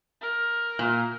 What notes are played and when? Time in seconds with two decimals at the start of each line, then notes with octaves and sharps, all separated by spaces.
0.21 A#4
0.79 A#2